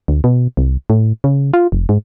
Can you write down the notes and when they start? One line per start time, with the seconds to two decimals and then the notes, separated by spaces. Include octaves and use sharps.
0.08 D2
0.24 B2
0.57 C2
0.90 A2
1.24 C#3
1.54 F4
1.72 F1
1.89 G#2